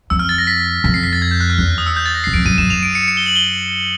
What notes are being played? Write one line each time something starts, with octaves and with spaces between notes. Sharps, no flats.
F2 E6
F6
A6
A#6
B6
F2 B6
C7
B6
A6
G#6
G6
F#6
F6
E2 F#6
F6
D#6
E6
G6
A6
A#6
C7
F#2
F2 D7
F#2 D#7
F#2 E7
F#2 F7
D7
C#7
C#7
G7
F#7
G7